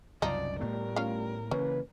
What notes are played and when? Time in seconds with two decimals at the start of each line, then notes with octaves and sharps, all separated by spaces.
0.22 C2 F#2 C#3 F3 D#4 D5
0.61 A2 G3 A3 B3 A#4
0.96 C#4 F4 F5
1.51 C#3 E3 A#3 C#4 B4